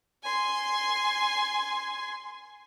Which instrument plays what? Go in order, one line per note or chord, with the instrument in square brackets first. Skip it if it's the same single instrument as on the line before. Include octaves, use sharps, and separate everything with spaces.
[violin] G#5 C6